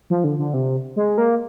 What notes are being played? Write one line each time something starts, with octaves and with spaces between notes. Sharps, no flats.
F3
D3
D3
C3
G#3
A#3